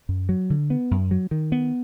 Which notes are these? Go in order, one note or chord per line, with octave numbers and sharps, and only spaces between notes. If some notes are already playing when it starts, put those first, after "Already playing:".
F#2
F#3
D3
B3
F#2
F#3
D#3
B3